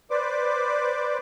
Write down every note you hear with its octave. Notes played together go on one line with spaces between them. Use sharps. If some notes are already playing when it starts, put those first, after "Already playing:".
B4 C5 D5 D6